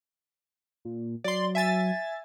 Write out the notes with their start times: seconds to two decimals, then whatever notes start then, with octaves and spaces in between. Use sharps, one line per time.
0.85 A#2
1.24 F#3 D5 C6
1.55 E5 G#5 A6